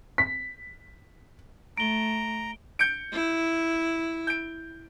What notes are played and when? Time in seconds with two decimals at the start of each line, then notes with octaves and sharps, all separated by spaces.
0.18 B6
1.78 A3 A#5 D7 G7
2.79 G6 C#7 D7
3.13 E4
4.27 G6 D7